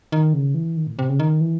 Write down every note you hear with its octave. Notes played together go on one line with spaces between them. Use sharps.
D#3
C#3
E3
D#3
A2
C3
C#3
D#3
E3